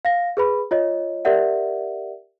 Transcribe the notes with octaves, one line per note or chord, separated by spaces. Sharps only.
F5 A#6
G#4 B4 B5
F4 C#5 D#5
G4 A#4 D5 E5 F#5